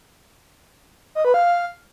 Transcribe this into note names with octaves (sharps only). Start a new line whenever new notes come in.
D#5
B4
F5